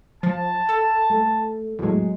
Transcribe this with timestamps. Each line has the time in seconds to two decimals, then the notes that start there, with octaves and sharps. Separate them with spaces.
0.23 F3 A5
0.69 A4
1.10 A3
1.79 E2 A2 F#3 G#3